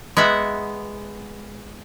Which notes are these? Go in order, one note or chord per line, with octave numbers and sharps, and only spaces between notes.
G#3 B3 E5 F#5